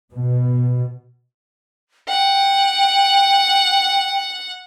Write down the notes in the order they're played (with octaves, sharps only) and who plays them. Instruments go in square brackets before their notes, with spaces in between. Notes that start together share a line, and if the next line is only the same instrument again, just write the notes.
[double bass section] B2
[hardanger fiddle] F#5 [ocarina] G5